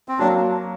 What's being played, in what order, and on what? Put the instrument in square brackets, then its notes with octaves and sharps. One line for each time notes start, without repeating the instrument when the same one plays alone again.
[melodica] C4
[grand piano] F#3 A#3 [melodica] D4